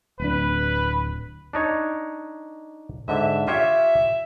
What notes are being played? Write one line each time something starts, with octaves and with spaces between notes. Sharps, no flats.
D1 D4 B4
D4 D#4 C#5
G#2 D3 E5
F4 G4 C#5 E5